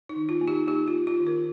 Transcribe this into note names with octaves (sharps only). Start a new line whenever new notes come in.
D#4
D#3
F4
A#3
D#4 G4
A#3 D#4 G4
F4
A#3
F4
D#3
F4 A#4